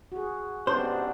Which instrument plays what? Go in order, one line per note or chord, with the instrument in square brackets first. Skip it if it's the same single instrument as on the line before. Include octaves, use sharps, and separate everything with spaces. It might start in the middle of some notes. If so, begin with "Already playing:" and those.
[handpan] F#4 G#4
[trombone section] G#1 C3 D4 [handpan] B3 C#4 [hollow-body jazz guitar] C5